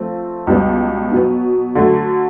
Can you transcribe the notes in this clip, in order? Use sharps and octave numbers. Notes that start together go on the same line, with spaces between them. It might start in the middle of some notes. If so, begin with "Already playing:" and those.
Already playing: F3 A3 C4
C#2 B2 G3 B3
B2 F#3 B3
D3 F#3 A3